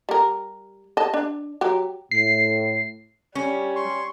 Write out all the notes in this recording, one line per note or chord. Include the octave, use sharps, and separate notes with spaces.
G3 A#4
D#5 A5
D4
F#3 G4
A2 C7
G3 C#4
C6 C#6